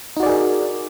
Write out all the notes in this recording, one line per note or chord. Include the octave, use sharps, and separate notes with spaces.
D#4 F#4 G#4 A#4 D5